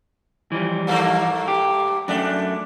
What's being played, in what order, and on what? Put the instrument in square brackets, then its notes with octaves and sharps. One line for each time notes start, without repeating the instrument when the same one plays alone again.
[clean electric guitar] E3 F3 G3
[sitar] G2 A3 A#3
[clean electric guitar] G4
[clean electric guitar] F#2 A3 [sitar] D4